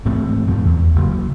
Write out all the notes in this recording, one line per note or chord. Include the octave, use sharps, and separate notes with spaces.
A1 G#2 A3 C4
F2 A3
E2
F#1